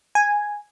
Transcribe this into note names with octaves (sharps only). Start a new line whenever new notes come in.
G#5